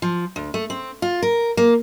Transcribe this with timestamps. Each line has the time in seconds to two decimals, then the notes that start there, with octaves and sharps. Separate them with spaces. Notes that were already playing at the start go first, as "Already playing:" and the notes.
0.02 F3
0.36 D2
0.54 A3
0.70 C4
1.02 F4
1.22 A#4
1.57 A#3